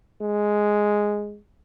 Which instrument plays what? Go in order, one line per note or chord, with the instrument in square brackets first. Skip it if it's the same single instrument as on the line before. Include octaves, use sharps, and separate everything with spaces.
[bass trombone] G#3